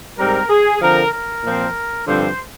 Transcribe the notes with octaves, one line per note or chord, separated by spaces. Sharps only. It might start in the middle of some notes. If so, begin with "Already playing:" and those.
G#2 G3 C4 A#4
G#4
D3 F3 C4 A#4
A#4
A#2 F3 C4
G2 D3 F3 C4 C5